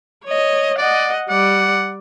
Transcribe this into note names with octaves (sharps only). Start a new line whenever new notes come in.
C#5 D#5
D5 D#5 F#5
G3 D5 F#5